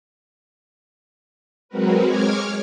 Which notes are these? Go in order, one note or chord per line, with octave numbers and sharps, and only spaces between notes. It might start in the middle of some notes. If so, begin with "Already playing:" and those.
F#3 G#3 C4 F#4 A#4 B4
G#3 C#5 D6 F6 G#6